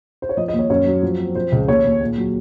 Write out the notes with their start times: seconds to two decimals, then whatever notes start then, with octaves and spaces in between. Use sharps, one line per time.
0.22 C5
0.29 C#5
0.37 F3 D#5
0.48 D#5
0.53 D#2
0.59 C#5
0.70 F#2 C#5
0.86 F#3
1.03 F3
1.19 C4
1.35 F3 C5
1.52 C#2
1.68 D#2 C#5
1.85 D#2
2.01 A#2
2.18 F#3